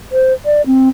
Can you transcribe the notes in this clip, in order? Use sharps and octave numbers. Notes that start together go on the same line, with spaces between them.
C5
D5
C4